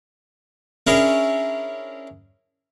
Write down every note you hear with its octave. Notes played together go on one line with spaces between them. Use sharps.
C#4 D4 E4 G#4 A#4 C#5